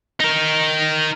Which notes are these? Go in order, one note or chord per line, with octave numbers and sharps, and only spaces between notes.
D#4 A#4